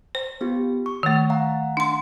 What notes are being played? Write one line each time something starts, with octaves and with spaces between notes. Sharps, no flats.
C5
B3 F4 G4
C#6
D#3 A3
F5 F#5 A#5
D4 C6